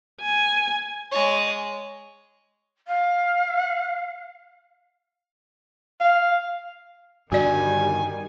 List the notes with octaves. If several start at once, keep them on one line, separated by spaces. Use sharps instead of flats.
G#5
G#3 C#5
F5
F5
G2 D3 D#3 G3 F#4 D5 G#5